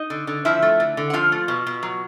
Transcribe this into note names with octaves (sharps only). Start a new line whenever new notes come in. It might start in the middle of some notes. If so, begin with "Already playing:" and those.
Already playing: D#4 D#5
D3
D3
F3 E4 E5
A3
D3
D3
F#5
F3 F4 F5
A3
B2
B2
F#3